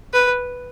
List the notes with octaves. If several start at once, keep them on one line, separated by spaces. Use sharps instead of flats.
B4